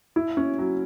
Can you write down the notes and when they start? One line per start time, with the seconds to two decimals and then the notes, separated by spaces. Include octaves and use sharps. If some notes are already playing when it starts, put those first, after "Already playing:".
0.16 E4
0.37 C#4
0.58 F#3